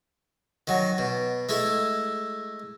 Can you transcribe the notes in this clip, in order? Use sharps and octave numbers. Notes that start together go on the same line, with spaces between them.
D#3 F#3
B2
G#3 A3 E4